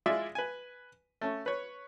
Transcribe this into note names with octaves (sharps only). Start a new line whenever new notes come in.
G#3 E4 F4 D5 E5
B4 G#5
A3 C#4
B4 C#5